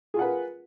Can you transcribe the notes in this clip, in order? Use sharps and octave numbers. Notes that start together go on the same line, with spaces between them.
F4 G#4 A#4 B4 F#5